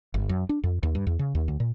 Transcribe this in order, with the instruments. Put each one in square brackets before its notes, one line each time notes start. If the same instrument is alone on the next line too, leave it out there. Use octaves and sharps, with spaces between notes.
[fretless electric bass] G1
F#2
D4
F2
D#2
G2
E2
C#3
D#2
D2
A#2